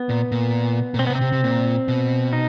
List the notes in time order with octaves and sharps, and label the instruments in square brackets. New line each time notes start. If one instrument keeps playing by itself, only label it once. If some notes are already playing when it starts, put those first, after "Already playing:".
Already playing: [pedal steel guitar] B3
[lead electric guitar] A#2
A#2
A#2
[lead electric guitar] B2 [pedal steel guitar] C4
[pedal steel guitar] B3
[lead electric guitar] C3
[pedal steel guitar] C4
[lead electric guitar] C3
C3
A#2
B2
[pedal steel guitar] D#4